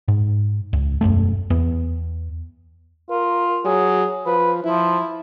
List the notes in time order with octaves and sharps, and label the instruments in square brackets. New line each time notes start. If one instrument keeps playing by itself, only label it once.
[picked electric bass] G#2
C#2
E1 C#2 F#2 A3
E2 B3
[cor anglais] F4 [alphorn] A#4
[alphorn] F#3 [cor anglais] G#4
[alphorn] F3 [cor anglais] B4
[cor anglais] F3 [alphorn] E4